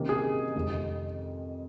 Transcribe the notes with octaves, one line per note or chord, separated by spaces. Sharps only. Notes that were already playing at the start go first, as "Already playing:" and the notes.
Already playing: C3 D#3 A#3 C#4
G#4
F2 C3 D#3 G#3